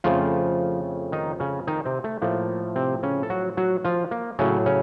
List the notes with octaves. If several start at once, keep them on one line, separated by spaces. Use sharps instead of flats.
F2 C#3 F3 A3 F4
D#3 D#4
C#3 C#4
D#3 D#4
C3 C4
A3
A2 F3 A3 A#3
C3 C4
C#3 C#4
A4
F#3 F#4
F#3 F#4
F3 F4
A#3
A2 C#3 F#3 A3 C#4
C#3 C#4